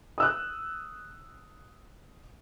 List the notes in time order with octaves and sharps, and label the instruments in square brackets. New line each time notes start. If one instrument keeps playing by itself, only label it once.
[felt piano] D#6 E6 F#6